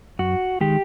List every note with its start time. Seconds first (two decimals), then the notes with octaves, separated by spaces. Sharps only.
0.19 F#2 F#4
0.61 D#3 G#3 G4